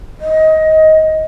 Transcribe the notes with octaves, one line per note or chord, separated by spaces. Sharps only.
D#5